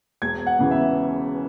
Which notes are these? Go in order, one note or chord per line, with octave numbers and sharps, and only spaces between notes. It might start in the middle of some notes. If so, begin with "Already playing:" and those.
E1 G#6
F#5
E2 C#3 E3
E5